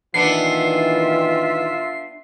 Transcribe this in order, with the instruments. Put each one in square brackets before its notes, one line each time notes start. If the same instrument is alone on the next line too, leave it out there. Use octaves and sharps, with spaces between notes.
[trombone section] A#2 D#3 E3 [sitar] B3 D4 [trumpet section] F4 E5 [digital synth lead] C7